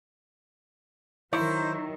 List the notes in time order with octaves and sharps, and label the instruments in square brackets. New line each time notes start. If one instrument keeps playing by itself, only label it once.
[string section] D#3 F#3 [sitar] E4 [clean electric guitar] A#4 C#5 [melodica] C5